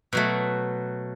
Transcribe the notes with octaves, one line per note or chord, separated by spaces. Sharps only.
B2 F#3 A3